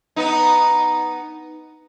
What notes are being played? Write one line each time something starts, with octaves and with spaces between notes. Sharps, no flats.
B3 D#4